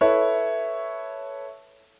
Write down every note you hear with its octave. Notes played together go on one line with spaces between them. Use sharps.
E4 A4 B4 C#5